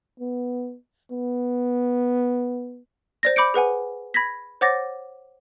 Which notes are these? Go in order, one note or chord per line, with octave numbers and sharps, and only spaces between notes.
B3
B3
C5 D5 A#6
B5 D6 G6 C#7 D7
G#4 B4 F#5 G#5
B5 G#6 A#6 B6
C5 C#5 F#5 D6 A6 A#6